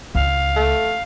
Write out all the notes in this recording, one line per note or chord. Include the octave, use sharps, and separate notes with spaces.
C#2 F5
A3